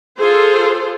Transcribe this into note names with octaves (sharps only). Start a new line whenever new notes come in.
F4 G#4 A4 C5